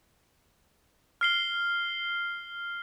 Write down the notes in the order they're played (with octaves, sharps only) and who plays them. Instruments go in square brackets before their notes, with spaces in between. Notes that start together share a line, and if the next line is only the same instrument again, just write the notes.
[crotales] F6 C7 G7